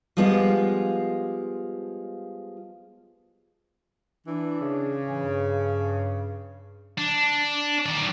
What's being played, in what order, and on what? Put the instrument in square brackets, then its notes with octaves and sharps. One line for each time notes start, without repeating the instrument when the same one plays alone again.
[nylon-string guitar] F3 G3 G#3 B3 F4
[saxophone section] E3 [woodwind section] D4
[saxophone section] C#3
[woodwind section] A2 E3 C#4
G2
[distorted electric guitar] D4
D#3 D5